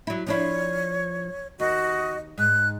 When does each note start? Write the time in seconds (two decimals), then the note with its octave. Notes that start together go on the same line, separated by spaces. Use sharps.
0.07 F#3 E4
0.27 F3 D4 E4 C#5
1.60 D#2 F#4 D#5
2.38 G#2 F#6